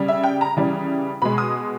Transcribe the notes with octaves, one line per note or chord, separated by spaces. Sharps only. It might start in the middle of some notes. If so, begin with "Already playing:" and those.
Already playing: C#3 G3
E5
G5
A#5
C#3 E3 G3
B2 G#3 B5
D#6